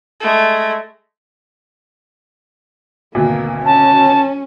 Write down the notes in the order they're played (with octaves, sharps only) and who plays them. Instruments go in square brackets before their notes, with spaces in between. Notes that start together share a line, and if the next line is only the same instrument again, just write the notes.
[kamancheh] G#3 A3
[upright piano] G#1 D2 B2 [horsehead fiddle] A#3
[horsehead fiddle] C#4 [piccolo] A5